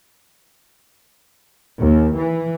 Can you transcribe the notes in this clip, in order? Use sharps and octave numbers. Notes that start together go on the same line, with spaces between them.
D#2
E3